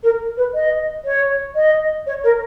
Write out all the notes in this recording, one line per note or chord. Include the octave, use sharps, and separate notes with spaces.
A#4
B4
D#5
C#5
D#5
C#5
A#4